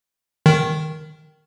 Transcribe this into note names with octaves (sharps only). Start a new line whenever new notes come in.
D#3